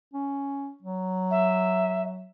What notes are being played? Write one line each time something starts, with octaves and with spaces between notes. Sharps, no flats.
C#4
F#3
E5